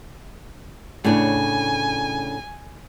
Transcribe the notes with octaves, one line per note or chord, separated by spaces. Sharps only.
A2 C#3 D4 G#5